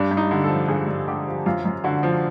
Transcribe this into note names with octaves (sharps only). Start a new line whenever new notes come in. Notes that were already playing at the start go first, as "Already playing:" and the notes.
Already playing: G2 D4
G2
D#4
D3
A4
F3
G2 G#4
G2
D3 G4
F3
F#2 F4
F#2
D3 F#4
F3